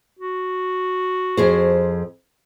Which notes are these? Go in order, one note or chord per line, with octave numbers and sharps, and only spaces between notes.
F#4
F2 G#4 C5